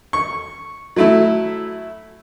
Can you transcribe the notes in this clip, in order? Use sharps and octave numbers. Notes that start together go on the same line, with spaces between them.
C#6
F#3 A3 E4